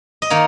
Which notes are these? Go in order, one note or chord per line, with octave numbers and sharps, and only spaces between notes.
D#5
D#3 A#3 A#4 C#5